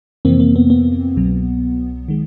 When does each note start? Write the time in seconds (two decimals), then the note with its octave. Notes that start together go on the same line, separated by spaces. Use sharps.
0.25 F2 C3 E3 A#3 C4
0.40 A#3
0.56 B3
0.70 B3
1.16 C2 B2 F#3
2.08 D#3 G#3